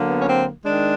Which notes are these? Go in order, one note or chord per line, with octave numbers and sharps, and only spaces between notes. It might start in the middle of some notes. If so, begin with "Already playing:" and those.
Already playing: D3 F#3 A#3
B3
C#4
C4
D#3 G#3 D4